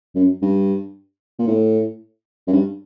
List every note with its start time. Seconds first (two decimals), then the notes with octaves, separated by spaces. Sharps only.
0.15 F#2
0.42 G2
1.39 A#2
1.47 A2
2.47 F#2
2.53 G2